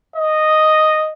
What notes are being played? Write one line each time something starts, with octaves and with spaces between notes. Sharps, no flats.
D#5